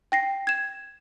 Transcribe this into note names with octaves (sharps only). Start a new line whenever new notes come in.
G5 A#6 C7
G#6 E7